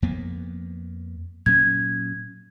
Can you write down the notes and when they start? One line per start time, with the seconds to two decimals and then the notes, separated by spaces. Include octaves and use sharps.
0.02 F2 A#3 B3
1.46 A#2 F#3 C#4 G#6